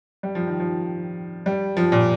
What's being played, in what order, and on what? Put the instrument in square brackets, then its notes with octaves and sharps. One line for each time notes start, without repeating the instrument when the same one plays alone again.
[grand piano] G3
F3
D#3
F3
G3
F3
A#2